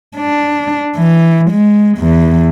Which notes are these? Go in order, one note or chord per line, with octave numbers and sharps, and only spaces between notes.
D4
E3
G#3
E2